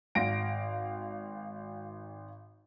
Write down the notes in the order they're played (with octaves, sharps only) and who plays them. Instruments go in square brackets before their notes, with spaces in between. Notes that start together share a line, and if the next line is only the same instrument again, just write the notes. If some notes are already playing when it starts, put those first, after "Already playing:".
[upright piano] G#1 F5 A#6 D7